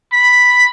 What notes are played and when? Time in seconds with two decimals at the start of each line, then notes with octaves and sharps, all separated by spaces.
0.12 B5